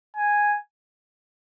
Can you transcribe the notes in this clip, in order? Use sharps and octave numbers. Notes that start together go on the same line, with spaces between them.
G#5